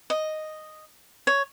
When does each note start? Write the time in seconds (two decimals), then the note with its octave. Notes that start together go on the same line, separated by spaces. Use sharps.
0.10 D#5
1.27 C#5